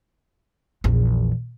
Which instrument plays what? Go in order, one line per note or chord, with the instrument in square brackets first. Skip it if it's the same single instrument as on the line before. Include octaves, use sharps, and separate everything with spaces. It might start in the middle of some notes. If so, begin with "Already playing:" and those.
[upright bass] A#1 E2